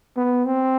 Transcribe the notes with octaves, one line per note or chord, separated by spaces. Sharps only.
B3
C4